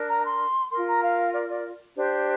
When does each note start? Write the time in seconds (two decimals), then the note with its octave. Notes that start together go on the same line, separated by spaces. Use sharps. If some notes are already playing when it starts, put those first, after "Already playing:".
Already playing: D4 A#4
0.09 A#5
0.24 C6
0.70 F4 A#4 C6
0.87 A#5
1.02 F5
1.33 D5
1.49 D5
1.96 D4 G4 C5